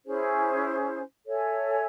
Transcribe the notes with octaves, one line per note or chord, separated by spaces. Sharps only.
C#4 E4 G#4 C5
A4 C#5 E5 G#5